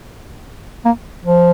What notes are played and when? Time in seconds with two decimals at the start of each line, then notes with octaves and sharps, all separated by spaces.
0.85 A#3
1.24 F3